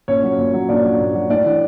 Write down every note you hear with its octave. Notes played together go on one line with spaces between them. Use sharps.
A#2 C#4 C#5
F#3
A#2
F#3
A#2 D4 D5
F#3
A#2
F#3
A2 D4 D5
E3